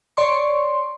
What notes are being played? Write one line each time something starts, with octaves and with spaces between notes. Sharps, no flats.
C#5 D5 C6 C#6